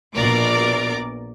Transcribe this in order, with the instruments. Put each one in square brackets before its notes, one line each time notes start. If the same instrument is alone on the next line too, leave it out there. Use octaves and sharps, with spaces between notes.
[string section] A#1 B2 A#4 D5 D6